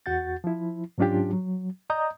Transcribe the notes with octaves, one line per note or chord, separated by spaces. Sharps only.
E2 F#4 F#5 G6 A6
F3 E4
G#2 F#3 C#4 D4 F4 G4
F#3
D5 D#5 A#5 D#6 G6